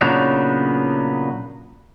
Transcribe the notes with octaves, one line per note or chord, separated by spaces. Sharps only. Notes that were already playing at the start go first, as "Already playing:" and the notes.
A#2 C#3 F#3 B3 D4 D#4